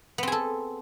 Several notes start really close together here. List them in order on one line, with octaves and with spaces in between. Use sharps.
B3 C4 G#4 A4